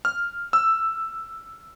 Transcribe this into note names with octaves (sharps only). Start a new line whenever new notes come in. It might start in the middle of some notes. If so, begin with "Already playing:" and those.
F6
E6